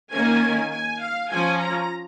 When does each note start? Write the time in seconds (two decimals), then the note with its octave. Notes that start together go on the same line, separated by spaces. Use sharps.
0.11 D#3 A#3 C#4 G#5
0.70 G#5
1.00 F5
1.29 F3 C#4 G#5
1.59 A#5